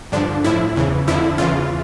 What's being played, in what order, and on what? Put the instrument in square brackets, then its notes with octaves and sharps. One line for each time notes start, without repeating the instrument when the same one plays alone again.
[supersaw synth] G2 D3 F3 D4
A2 F3 E4
E2 C#3 E3
F2 D3 F3 E4
E2 C#3 E3 F4